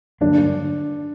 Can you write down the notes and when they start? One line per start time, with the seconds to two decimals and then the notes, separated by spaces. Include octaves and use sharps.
0.21 G2 D3 F#3 A#3 D4